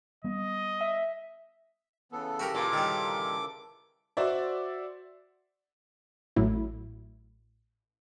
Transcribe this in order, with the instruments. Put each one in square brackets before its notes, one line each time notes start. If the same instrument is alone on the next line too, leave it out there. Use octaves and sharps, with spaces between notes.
[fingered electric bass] G3 B3 [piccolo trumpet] D#5
[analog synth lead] E5
[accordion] C#3 E3 A4 [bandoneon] B3
[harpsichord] F#4 G4 A#4
[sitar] A#2 [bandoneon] D6
[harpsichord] D#3 G3
[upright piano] F#4 C5 D5 E5
[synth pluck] A1 A2 F#3 E4